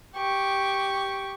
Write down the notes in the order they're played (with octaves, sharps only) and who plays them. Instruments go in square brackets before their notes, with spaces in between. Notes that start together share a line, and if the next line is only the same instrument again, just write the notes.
[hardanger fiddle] G4 C#6